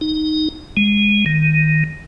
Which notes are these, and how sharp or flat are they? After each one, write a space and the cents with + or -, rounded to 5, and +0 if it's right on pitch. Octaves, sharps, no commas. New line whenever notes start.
D#4 -5
G#3 -15
D#3 +0